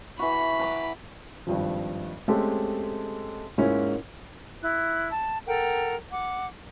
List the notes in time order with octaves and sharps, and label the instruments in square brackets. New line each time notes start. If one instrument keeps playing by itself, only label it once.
[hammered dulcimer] E3 F#4 [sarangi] B5
[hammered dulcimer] B4 A#5 D6
[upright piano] G#1 G2 F3
G#3 A3 C4 C#4 G4 A4
G#2 G#3 A#3 C#4 E4 F4
[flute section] E4 F#6
A5
A4 A#4 F#5 G5
F#5 D6